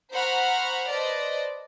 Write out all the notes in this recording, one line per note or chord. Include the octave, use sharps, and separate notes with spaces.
C5 F#5 A#5 B5 C#6 F6
B4 C5 D5 D#5 A5